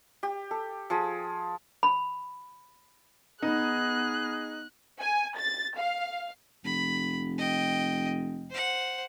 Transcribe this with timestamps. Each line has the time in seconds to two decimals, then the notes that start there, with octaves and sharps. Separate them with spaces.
0.23 G4
0.51 A4
0.90 F3 G#4
1.83 B5
3.42 B3 D#4 G#4 F#6
5.00 G#5
5.38 A6
5.77 F5
6.65 F1 B5
7.38 D#5 G5
8.51 C5 F#5